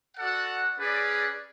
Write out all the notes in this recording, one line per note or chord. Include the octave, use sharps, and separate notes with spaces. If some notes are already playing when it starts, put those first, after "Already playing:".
F#4 A4 D5 F#5
C#4 G#4 B4 D5